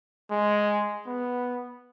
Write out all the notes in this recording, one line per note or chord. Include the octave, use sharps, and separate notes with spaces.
G#3
B3